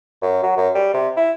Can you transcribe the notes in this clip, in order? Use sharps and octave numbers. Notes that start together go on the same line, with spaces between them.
F#2
F#3
F#2
G3
C3
E4